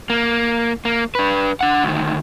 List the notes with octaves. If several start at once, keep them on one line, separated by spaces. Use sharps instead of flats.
A#3
A#3
D4 B4
D4 F#5
D2 D#3